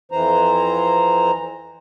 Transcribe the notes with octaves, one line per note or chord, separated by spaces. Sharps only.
F2 E3 C5 A#5